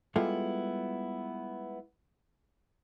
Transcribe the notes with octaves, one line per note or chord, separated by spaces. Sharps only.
G3 G#3 B3 E4 F4 A4